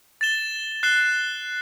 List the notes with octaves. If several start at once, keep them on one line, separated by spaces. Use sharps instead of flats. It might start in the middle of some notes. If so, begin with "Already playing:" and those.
A6 E7 G7
F#6 C7 E7 G7